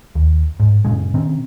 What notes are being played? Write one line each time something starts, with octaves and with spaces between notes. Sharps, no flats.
D#2
G#2
F#2 A#2 C#3 G#3
B2 D#3 C4 C#4